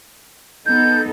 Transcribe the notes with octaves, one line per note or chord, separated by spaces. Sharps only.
B3 D#4 A4 G6